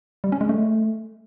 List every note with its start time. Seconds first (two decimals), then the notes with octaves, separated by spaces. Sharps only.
0.24 G3
0.32 C#4
0.41 G#3
0.49 A3